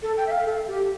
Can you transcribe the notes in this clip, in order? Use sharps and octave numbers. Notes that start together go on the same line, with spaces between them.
A4
G5
E5
F5
A4
G4